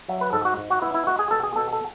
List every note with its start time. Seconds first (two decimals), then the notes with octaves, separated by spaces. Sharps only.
0.09 F#3 E5
0.21 B4
0.33 G#2 A4
0.45 F#4
0.57 G#2
0.70 F#4
0.82 B3 E4
0.94 E4
1.07 G#3 F#4
1.19 G#4
1.31 B2 A4
1.43 G#4
1.56 B2 A4
1.72 A4